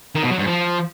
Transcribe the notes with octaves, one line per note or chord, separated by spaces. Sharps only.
D#3
B2
F#3
G2
F3